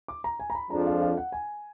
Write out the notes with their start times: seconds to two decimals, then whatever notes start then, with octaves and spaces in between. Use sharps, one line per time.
0.08 D6
0.24 A#5
0.40 G#5
0.50 A#5
0.55 B5
0.70 F2 F3 G#3 D4 A#5
0.86 F5
1.02 F5
1.17 F#5
1.32 G#5